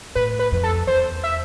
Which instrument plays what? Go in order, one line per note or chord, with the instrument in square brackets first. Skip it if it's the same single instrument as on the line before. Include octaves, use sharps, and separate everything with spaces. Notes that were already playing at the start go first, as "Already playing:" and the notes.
[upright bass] A2 [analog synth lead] B4
[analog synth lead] B4
[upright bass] F2
[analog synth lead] A4
[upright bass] E2 [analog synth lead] C5
[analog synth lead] E5